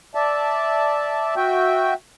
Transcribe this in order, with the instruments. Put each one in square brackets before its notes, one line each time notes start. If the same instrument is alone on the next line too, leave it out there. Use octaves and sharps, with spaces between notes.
[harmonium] D5 E5 A5
F#4 E5 G5